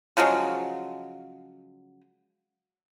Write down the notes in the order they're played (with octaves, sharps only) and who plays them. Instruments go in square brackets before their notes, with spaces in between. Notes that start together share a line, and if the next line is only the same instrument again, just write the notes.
[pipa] C#3 F3 F#3 G#3